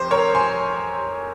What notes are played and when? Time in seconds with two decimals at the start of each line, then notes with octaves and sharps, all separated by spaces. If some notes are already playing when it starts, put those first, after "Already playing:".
Already playing: F2 C3 C5
0.11 A#4 C#5
0.35 G#5 C6